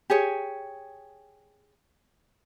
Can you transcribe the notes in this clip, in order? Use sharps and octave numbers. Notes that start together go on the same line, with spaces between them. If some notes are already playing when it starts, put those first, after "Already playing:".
G4 G#4 C#5